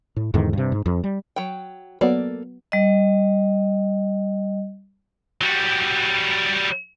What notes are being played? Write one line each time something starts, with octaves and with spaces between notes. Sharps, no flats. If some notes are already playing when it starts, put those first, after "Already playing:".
A2
E2 G#2 D3 D#3
G2 C3
G#2
F2
G3
F#3 G5
F#3 A#3 B3 A4 D5
G3 D#5
F#3 G3